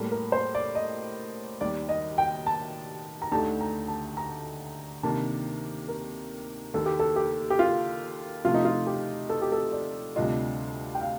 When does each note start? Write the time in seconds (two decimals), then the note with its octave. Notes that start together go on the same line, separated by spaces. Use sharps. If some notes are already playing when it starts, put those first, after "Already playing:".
Already playing: A2 G3 A#3
0.12 A#4
0.32 C5
0.55 D5
0.75 D#5
1.61 D#2 D#3 G3 D5
1.89 D#5
2.18 G5
2.46 A5
3.22 A#5
3.32 D2 D3 A3 D#4 G4 A5
3.61 A#5
3.88 A5
4.17 A#5
5.03 C3 D#3 A#3 D4 A5
5.88 A#4
6.74 D#2 D#3 A#3 A4
6.86 G4
7.00 A4
7.16 G4
7.50 G4
7.59 F4
8.45 C3 F3 A3 F4
8.54 D#4
8.65 F4
8.87 G4
9.30 A4
9.42 G4
9.52 A4
9.72 D5
10.16 D2 C3 G3 D4 F4 D#5
10.95 G5
11.01 F5